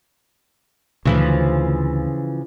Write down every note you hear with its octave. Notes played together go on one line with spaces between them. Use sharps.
D2 C#3 E3 F3